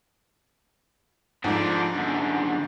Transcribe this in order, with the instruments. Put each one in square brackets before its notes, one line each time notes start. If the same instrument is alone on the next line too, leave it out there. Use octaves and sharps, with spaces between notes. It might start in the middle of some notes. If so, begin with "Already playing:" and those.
[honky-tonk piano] G#2 [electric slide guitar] F3 A3 D4
[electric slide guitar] F#2 D3